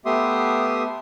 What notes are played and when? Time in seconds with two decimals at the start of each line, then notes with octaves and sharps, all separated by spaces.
0.06 A3 B3 G4 E5 C6 D#6